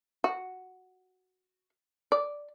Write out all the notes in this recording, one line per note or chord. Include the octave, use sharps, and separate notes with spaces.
F#4
D5